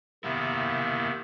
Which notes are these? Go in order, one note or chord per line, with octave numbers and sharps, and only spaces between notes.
C3 D#3 A#3 B3 E4